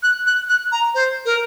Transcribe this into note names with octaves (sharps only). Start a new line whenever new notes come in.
F#6
F#6
F#6
A#5
C5
A#4